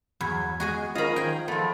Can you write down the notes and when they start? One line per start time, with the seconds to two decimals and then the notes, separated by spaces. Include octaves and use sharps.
0.21 E2 G2 F#3 B5 G#6
0.60 G#3 F#4 G#4 D#5
0.95 C#4 F4 A#4 C5 D#5 F5 B5
1.16 D#3 G#4 G5
1.48 F3 A3 B3 A4